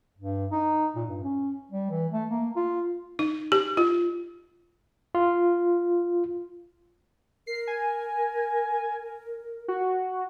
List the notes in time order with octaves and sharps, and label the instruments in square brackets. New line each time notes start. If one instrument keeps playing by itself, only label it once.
[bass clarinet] G2
D#4
A#2
G2
C#4
G3
E3
A3
A#3
F4
[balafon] D#4
G4
F4
[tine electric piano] F4
[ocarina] A#4 [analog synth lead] C7
[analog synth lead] G#5
F#4